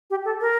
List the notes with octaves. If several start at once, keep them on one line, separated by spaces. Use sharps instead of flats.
G4
A4
A#4